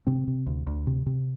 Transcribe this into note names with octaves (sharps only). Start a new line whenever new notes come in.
C3 C4
C3
D2
D2
C3
C3